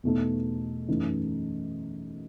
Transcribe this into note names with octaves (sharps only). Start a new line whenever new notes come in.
E2 B2 A3 D#4 A4
F#2 E3 A3 D#4